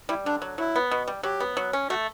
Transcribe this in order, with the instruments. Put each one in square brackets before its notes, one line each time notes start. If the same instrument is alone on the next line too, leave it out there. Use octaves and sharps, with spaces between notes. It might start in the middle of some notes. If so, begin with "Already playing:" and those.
[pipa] G3 [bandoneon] E4
[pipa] D3 [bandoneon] D4
[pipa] F#3
[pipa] F#3 [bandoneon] E4
[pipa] B3
B2
G3
[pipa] F#3 [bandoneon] G4
[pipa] B3
F#3
C#4
[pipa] A3 [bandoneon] F#4